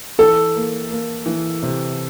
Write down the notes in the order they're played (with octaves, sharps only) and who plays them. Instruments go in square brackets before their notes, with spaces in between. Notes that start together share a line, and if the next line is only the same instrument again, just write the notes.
[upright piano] E3 [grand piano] A4
[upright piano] A#3
A#3
E3
C3